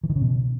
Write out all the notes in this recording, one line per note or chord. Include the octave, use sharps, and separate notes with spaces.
E3
D#3
C#3
B2